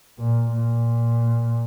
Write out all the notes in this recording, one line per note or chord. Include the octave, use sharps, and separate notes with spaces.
A#2
A#2